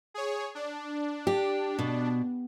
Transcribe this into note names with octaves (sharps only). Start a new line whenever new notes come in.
G#4 C#5
D4
G4
B2